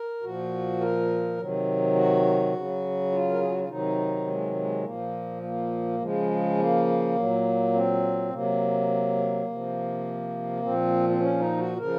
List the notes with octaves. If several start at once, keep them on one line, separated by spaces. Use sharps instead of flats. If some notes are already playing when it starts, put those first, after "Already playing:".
Already playing: A#4
A#2 F3 F#4
A#4
C3 D#3 F#3
F#4
C#3 F#3
F4
A#4
G#4
F#4
F4
C3 D#3 F#3 D#4
G#3
G#3
A#2 F3 A#3
A#3
C#3 F3 G#3
A#3
A#2 F#3
C4
C3 F#3 A#3
C3 F3
A#2 F3 C4
C4
C#4
D#4
F#4
C#3 F3 A#4